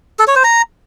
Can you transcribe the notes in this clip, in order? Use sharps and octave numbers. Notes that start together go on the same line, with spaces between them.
A4
C#5
C5
A#5